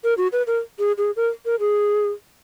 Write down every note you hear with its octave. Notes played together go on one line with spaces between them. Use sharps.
A#4
F#4
B4
A#4
G#4
G#4
A#4
A#4
G#4